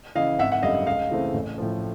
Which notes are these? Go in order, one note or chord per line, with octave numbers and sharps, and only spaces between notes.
C#3 E3 D#5 F5
G#1 E5 F#5
F#5
F#2 D3 G3 D#5 F5
C#2 D#5 F5
C#3 E3 A3 C4
A1
A2 F3